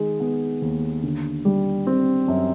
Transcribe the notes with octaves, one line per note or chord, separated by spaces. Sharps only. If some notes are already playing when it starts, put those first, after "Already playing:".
Already playing: D#3 G#3
B3
D#2
D3
G3
C4
F#2